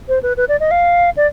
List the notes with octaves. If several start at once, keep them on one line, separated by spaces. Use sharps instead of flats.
C5
B4
B4
D5
D#5
F5
D5